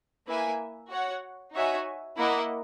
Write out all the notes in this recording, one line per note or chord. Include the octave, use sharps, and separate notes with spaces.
A#3 E4 B4 E5 G#5
F#4 C#5 F#5
D#4 F#4 C#5 E5 G#5
A#3 E4 A#4 D#5 F#5